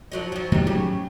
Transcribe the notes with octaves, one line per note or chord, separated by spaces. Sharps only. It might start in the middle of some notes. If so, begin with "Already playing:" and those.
F3 F#3 D#4
F3 F#3
A2 D#3 F#3 D#4 G4
C#3 F#3 G4